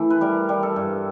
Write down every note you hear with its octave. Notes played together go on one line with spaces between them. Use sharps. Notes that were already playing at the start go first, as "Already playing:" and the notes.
Already playing: E3 A3
B4
G3 A#4
G3
A4
G2